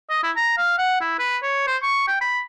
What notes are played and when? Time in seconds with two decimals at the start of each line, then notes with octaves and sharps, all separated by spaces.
0.10 D#5
0.23 E4
0.36 A#5
0.58 F5
0.78 F#5
1.01 E4
1.19 B4
1.43 C#5
1.67 C5
1.83 C#6
2.08 G5
2.21 B5